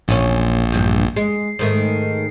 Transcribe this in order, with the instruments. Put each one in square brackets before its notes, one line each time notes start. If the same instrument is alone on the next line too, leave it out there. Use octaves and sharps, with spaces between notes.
[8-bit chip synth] A#1 [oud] E2 A#2 C#4
[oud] E2 G2
[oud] G#3 [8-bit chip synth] C7
[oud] G#2 D#3 A3